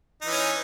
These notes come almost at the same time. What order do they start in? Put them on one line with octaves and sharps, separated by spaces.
D#4 E3 C#4